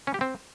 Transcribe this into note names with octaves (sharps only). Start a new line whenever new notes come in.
C#4
G4
C4